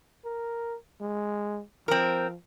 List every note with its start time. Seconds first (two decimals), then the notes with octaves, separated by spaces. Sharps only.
0.25 A#4
1.01 G#3
1.88 F3 C4 A#4